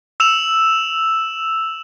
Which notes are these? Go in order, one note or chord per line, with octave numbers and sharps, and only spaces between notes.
E6 E7 F7